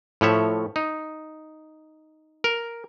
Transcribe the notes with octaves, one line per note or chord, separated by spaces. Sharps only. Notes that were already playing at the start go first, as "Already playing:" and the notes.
A2 F3 C#5 E5
D#4
A#4